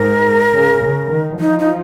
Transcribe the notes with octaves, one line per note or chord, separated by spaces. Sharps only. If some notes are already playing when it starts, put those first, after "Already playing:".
Already playing: G#2 A#4
C#3
C#3
D#3
F3 D#4
D#4